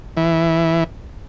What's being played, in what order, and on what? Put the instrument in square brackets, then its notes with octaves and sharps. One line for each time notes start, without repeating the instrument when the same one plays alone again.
[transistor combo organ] E3